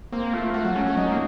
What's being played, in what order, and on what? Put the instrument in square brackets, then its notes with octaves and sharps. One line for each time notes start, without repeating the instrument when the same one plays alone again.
[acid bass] A#3 [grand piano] C4
[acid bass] A3 [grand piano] F4
[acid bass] A3 [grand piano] F#4
[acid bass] F#3
[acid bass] A3 [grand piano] C#4
[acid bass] A3
[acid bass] F#3 [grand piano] D#4
[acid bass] A#3